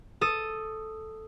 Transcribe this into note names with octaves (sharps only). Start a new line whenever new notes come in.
A4 D#6